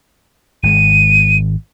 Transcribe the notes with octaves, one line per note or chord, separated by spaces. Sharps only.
G#1 G#3 D#7